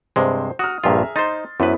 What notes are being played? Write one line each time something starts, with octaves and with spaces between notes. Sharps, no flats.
G2 C3 G#3 C5
F#4 D#6 F6
A#1 G2 F4 G#4 E5 A#5
D#4 C5 C6 A6
F#2 B3 E4 B4 C5